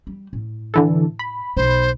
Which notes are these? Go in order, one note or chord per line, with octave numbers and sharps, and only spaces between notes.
G3
A2
D3 E3 A4
B5
B1 D#4 C5